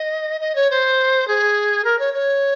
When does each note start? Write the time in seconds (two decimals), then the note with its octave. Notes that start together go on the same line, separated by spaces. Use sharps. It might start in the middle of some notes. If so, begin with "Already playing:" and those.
Already playing: D#5
0.41 D#5
0.55 C#5
0.71 C5
1.28 G#4
1.84 A#4
1.99 C#5
2.14 C#5